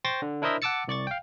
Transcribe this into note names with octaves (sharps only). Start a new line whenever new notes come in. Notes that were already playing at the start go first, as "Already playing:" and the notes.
C5 G5 C6 C#6 A6 A#6
D3
D4 E4 A#4 C5 D#5 E5
F#5 A5 D6 E6 A6 C#7
C2 D5 C#6 A6
F5 G5